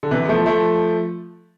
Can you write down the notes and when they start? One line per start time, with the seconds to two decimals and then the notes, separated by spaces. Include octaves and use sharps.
0.03 D3
0.11 C3 E3
0.25 B3
0.29 F3 A3
0.46 F3 A3